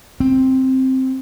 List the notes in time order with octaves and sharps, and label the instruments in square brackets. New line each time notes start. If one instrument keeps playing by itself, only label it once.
[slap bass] C4